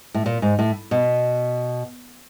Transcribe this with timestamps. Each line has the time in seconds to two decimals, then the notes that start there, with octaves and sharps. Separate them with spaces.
0.14 A2
0.26 A#2
0.42 G#2
0.59 A2
0.91 B2